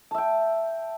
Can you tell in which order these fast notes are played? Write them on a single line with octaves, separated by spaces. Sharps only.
A5 E5 G5